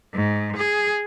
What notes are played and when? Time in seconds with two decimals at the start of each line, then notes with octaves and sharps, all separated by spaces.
0.14 G#2
0.57 G#4